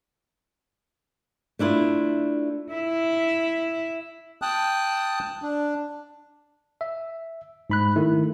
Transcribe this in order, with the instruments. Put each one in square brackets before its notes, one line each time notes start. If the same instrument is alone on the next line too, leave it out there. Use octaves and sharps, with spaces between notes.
[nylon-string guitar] A3 D4 E4 F4
[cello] E4 E5
[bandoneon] G5 A5 D#6 F#6
D4
[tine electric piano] E5
G#2 B5 F#6
D#3 A3 E4